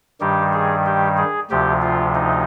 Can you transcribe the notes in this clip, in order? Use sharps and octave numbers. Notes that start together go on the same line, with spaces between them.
G2 D#3 G3 G4
G#4
G4
G#4
D2 C3 F3 G4
F4
D#4